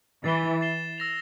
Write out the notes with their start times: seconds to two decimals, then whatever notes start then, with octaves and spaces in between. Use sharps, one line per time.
0.24 E3 A6 C7 E7 G7
0.61 A6 C7 E7 G7
0.98 E6 A#6 F7